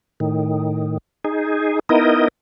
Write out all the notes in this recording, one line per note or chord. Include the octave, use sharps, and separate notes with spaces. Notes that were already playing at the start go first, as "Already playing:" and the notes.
A2 D#3
D#4 G#4
B3 D#4 E4 A#4 D#5